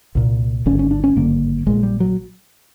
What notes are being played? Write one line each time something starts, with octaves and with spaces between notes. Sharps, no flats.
C2 A#2
G#1 G2 D3 C#4
C#4
D4
C#4
G#1 G2 D3 A#3
A#1 A#2 G#3
G3
F#3